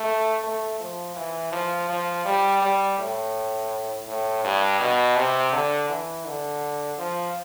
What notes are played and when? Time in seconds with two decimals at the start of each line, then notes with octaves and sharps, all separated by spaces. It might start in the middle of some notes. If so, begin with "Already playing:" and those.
Already playing: A3
0.43 A3
0.80 F3
1.16 E3
1.52 F3
1.89 F3
2.25 G3
2.62 G3
2.98 A2
4.08 A2
4.44 G2
4.80 B2
5.16 C3
5.53 D3
5.89 E3
6.26 D3
6.98 F3